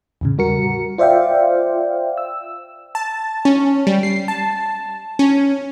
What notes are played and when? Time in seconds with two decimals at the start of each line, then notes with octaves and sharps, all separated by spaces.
0.21 E2 A2 C#3
0.38 G3 F#4 A#4 C#7
0.98 F4 C5 D5 E5 F5 G5
2.18 E6
2.95 A5
3.45 C#4
3.87 G3
4.03 C7
4.28 A5
5.19 C#4